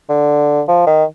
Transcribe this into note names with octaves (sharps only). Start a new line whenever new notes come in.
D3
F3
D#3